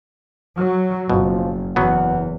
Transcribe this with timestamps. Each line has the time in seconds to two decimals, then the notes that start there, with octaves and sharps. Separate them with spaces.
0.59 F#3
1.10 F#1 B2 F3
1.76 F#1 E2 F#3 B3 F#5